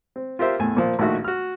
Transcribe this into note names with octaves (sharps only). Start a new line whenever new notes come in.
C4
F4 G4 A#4 C5 E5
E2 A2 G#5
A#2 F3 A#3
A#1 A2 D#3 F#4 E5
F#4 F6